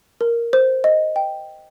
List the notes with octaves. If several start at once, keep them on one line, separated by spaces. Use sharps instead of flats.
A#4
C5
D#5
G5